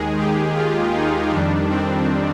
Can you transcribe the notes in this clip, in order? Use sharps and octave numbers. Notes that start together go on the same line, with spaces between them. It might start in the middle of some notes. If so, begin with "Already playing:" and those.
Already playing: D#2 D#3 G#3 G#4
G4
F4
D#4
F2 D#3 G3 D4
C4